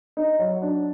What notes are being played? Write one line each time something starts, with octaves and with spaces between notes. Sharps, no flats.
D#4
F#3
D4